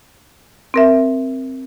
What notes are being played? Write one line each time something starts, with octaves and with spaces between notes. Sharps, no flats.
C4 A#4 E5